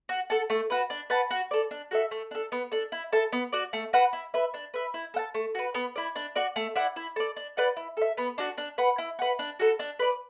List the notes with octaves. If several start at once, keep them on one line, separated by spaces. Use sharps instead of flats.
F#4
A4 F#5 A5
A3
F#4 B4
D4
B4 F#5 A5
F#4
A4 D5
D4
F#4 A4 E5
A3
D4 A4
B3
D4 A4
E4
A4 E5 A5
B3
F#4 D5
A3
F#4 B4 F#5
E4
B4 E5
D4
B4 E5
E4
A4 F#5 A5
A3
F#4 B4
B3
E4 D5
D4
F#4 D5
A3
E4 D5 F#5
E4
A4 D5
D4
B4 D5 F#5
E4
A4 E5
B3
D4 F#4
D4
B4 F#5
E4
B4 F#5
D4
F#4 A4
D4
B4 D5